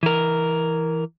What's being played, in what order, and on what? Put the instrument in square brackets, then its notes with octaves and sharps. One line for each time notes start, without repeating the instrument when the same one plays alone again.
[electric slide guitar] E3 A#4